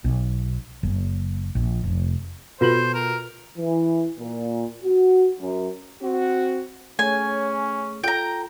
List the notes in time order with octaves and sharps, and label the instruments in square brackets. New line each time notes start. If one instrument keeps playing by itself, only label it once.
[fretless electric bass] B1
F#1
A#1
F1
[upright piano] B2 F#7 [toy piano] F4 A4 B4 [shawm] C5
[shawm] A#4
[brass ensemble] E3
A#2
F#4
F#2
[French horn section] C4 F#4
[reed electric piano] A3 G#4 C#5 [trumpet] C#4 [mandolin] G#5
[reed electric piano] F4 A4 [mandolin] G5 A#5